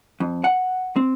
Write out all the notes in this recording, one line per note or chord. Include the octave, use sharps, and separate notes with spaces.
F2
F#5
C4